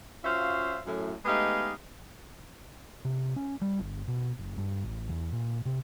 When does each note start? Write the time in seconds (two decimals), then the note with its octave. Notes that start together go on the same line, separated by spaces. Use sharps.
0.24 C#4 F4 F#4 C5 E5 F5
0.86 F#2 A2
1.25 G#3 A3 B3 D#4 G4 F5
3.05 C3
3.36 C#4
3.61 G3
3.80 G1
4.08 B2
4.39 F#1
4.57 G2
4.84 A1
5.09 E2
5.32 A#2
5.66 C3